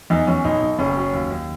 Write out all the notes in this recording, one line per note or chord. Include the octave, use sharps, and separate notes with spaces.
E2 D#4
E2 C#4
B1 D#4
B1
F#1 C#4
F#3
D#2
D#2